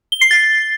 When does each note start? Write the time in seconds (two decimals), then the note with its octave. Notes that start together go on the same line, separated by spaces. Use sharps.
0.12 G7
0.21 C7
0.31 A6